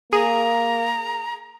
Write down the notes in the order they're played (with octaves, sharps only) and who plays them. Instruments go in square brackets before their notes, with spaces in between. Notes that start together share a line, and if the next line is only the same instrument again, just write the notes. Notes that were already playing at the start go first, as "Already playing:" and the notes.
[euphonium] A#3 [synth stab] G#4 [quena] A#5